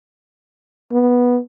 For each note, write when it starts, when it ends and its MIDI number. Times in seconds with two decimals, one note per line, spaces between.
0.92 1.39 59